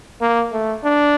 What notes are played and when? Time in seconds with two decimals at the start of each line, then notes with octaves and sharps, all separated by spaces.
0.21 A#3
0.53 A3
0.84 D4